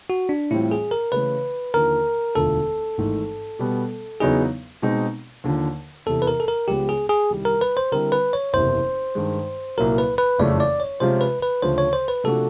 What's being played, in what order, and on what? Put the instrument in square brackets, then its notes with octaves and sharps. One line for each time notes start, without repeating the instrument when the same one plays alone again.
[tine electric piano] F#4
D4
[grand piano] A2 E3 G3 C4 F4 [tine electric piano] E4
[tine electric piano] G#4
A#4
[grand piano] C#3 E3 A3 [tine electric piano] B4
[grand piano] D#2 D3 F3 [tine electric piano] A#4
[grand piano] E1 D2 D3 F3 [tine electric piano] A4
[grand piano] G#1 G#2 E3 A3
B2 G3 B3
[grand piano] E2 C#3 F#3 B3 D#4 [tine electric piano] G#4
[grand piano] B2 G#3 C4 D#4
D#2 D3 F3
[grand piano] E2 C3 E3 [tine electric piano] A4
[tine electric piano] B4
A#4
A4
A#4
[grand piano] C#2 C#3 F3 G#3 B3 [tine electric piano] G4
[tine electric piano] G#4
G#4
[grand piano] C2 C3 D#3 G3
[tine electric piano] A#4
B4
C5
[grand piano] D3 G3 C4 E4 [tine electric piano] A#4
[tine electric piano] B4
C#5
[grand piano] F#1 E2 C3 [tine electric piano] C5
[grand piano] G2 D#3 G#3
[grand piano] C2 A#2 F#3 [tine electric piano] A#4
[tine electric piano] B4
B4
[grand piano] F#1 F2 C#3 E3 A3 [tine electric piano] D5
[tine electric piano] D5
C#5
[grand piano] C3 F3 G#3 C#4 F4 [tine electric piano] C5
[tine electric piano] B4
B4
[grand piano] D2 C#3 F3 [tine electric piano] C5
[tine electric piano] C#5
C5
B4
[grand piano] C3 F3 A3 D4 F#4 [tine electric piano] A4